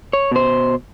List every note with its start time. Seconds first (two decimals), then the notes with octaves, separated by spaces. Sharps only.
0.13 C#5
0.31 B2 C5